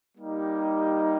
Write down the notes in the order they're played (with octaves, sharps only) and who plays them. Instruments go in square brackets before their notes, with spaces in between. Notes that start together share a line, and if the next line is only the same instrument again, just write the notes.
[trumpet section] G3 A#3 D#4 G4